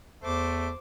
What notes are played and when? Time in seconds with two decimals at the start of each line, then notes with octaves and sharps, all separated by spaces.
0.23 E2 A3 C5 D6